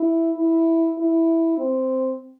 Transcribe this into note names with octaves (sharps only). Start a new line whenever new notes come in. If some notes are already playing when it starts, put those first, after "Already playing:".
Already playing: E4
E4
E4
C4